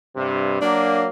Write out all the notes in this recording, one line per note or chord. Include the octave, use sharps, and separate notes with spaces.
G2 C3
F#3 A#3 D4